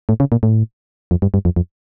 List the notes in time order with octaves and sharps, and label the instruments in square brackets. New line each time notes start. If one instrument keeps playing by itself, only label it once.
[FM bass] A2
C#3
A#2
A2
F2
G2
G2
F2
F2